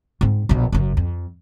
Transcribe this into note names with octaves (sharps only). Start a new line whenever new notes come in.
G#2 C4
A#1 B2
F#1 F#2
F2